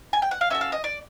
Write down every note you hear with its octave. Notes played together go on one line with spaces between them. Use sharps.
G#5
G5
F#5
F5
C#4 F#4 A4 E5
F5
D#5
D5